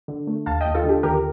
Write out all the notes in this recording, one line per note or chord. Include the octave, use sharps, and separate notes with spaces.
D3
A3
D#2 F5 A5
D#2 D#5 G5
F4 A4
D3 G4
D#2 G4 A#4